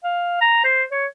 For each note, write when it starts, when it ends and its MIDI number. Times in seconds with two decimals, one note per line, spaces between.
0.04 0.39 77
0.41 0.63 82
0.64 0.83 72
0.92 1.06 73